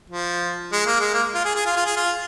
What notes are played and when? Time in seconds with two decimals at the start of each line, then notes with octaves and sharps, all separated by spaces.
0.10 F3
0.72 G#3
0.87 A#3
1.00 G#3
1.14 A#3
1.35 F4
1.45 G#4
1.55 G#4
1.66 F4
1.76 F4
1.86 G#4
1.97 F4